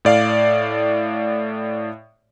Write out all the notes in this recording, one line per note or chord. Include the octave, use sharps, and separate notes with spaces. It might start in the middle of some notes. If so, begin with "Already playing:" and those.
A2 D5 F5